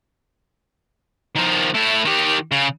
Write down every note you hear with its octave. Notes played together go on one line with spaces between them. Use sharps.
D#3 F3
A2 E4
D#3 G4
C#3